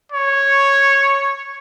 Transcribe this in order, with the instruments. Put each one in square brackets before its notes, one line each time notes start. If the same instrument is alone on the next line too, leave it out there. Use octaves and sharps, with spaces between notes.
[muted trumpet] C#5